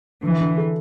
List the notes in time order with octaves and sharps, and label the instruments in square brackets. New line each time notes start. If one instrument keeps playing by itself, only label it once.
[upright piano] D3 [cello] E3
[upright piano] D3
A4